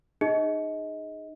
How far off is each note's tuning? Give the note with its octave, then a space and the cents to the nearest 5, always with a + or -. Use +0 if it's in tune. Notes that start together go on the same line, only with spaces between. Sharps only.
D#4 -30 G#4 +0 D#5 +25